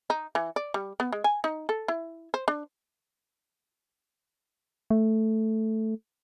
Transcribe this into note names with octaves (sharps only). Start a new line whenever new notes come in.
D#4
E3
D5
G3
B3
G#3
G#5
D#4
A4
E4
C5
D4
A3